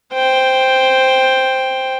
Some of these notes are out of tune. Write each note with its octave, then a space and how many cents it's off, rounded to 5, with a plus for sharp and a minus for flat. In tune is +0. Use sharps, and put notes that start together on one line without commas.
C5 +0 G5 +5